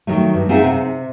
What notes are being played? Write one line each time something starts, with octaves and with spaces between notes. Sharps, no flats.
D#3 F#3 A3
G2
C4 D#4 F4 G#4 E5 F#5
C3